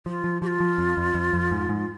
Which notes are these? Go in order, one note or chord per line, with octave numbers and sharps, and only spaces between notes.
F3 F4
F3
F3 G4
F4
F3
F2
F2
F2
F2
G#2
G#2